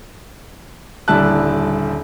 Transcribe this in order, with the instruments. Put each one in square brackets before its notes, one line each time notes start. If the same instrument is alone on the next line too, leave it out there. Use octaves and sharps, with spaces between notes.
[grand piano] D#1 D3 G3 E4 A5 F#6